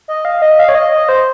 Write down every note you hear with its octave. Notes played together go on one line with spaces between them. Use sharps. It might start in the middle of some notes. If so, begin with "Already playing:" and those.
D#5
F5
D#5
F5
C#5
D#5
D#5
C5